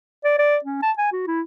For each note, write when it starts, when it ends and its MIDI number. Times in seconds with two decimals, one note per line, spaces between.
0.24 0.37 74
0.39 0.57 74
0.64 0.82 61
0.82 0.92 81
0.98 1.12 80
1.13 1.23 66
1.27 1.42 64